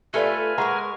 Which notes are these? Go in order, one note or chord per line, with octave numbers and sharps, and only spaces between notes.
A3 F4 G4 A4 B4 D5 G#5 F6
G#3 A#4 F#5 A#5 C#6